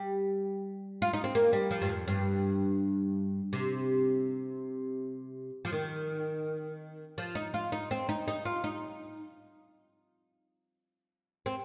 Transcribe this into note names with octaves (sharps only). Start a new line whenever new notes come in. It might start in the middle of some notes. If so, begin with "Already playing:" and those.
Already playing: G3
F4
D#4
C4
A#3
G3
F3
G2
F2
G2
C3
F3
D#3
F3
D#4
F4
D#4
C4
D#4
D#4
F4
D#4
C4